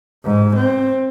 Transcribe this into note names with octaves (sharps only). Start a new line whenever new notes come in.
G#2
C4